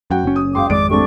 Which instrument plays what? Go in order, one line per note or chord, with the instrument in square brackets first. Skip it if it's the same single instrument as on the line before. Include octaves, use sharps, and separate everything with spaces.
[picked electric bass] F#2 [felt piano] F#4 F#5 G5
[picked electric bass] F#1 C#4
[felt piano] D#6
[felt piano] C#2 F#2 C6 [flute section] F5 G5 D6
[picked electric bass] G#1 F2 G#3 [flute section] D5 D6 [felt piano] D7
[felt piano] G3 A3 C4 [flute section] D4 C#6